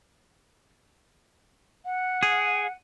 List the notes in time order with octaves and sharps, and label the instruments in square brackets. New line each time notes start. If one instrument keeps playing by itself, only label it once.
[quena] F#5
[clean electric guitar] G#4